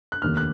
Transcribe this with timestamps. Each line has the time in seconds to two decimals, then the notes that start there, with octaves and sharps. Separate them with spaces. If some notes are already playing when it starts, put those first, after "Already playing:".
0.12 F#6
0.22 F1 D#2 D#3 F6
0.37 F#6